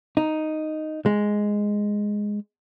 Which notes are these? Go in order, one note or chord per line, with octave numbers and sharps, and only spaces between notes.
D#4
G#3